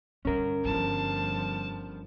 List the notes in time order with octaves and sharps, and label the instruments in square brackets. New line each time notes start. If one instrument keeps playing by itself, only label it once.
[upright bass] G2 D3 [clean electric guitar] C#4 A#4
[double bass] G1 F3 [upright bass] G2 D3 [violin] A5